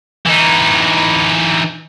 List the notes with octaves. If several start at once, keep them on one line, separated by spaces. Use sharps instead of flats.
E3 D#4